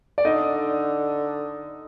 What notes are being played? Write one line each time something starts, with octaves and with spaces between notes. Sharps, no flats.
D5
D3 D#4 D#5